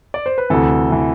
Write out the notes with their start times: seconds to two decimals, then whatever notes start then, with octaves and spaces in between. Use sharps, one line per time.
0.14 D5
0.26 C5
0.38 B4
0.50 D2 C3 E3 A4
0.91 C3 E3